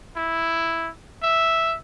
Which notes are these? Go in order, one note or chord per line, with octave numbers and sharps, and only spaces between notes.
E4
E5